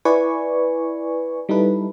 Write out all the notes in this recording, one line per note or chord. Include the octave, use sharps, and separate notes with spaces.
E4 B4 D5 G#5 C#6
G3 D#4 E4 A4 B4